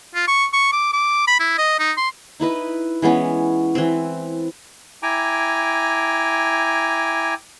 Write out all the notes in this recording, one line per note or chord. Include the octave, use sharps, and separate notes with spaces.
F4
C#6
C#6
D6
D6
B5
E4
D#5
D#4
C6
D#4 E4 B4 D#5
E3 G#3 B3 C#4
E3 C4
E4 G5 G#5 A#5 D6